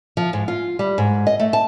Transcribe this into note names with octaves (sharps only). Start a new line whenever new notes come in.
F3
G#2
F4
G3
G#2
D#5
A3
A5